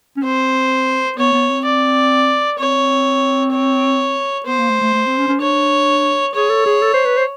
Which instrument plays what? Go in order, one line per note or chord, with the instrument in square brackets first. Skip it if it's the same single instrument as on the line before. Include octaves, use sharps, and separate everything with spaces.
[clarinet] C#4
[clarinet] C4 [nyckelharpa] C5
[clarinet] B3 [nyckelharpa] C#5
[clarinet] B3
C4
[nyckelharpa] D5
[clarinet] C4 [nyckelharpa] C#5
[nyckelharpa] C#5
[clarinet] B3 [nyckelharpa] C5
[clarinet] A#3
A3
A3
A3
C4
C#4
C#4
[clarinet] D4 [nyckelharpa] C#5
[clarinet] G#4 [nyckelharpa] C#5
[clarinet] A4
G#4
A4
C5
B4
C5